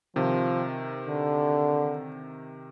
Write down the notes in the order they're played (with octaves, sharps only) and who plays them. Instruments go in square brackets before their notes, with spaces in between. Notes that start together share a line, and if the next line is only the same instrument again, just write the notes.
[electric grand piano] C3 D#3 [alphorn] F3
[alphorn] D3